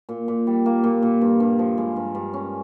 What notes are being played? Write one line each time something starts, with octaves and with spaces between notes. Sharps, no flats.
A#2
A#2
G3
A#3
A#2
A#2
G2
G2
F3
G#3
G2
G2
C#4